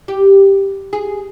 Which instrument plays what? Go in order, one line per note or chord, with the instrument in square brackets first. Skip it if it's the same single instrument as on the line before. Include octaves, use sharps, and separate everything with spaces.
[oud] G4
G#4